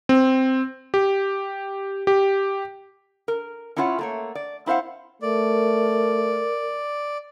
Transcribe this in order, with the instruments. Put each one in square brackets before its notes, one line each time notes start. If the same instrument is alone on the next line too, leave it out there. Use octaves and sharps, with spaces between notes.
[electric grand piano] C4
G4
G4
[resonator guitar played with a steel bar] A#4
C#4 D4 E4 F4 C#5 F#5
A3 A#3 C#5
D5
C4 E4 C5 F5 F#5
[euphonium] A3 [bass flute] A#4 [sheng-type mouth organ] D5